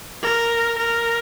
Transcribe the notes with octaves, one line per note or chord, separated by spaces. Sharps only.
A#4
A#4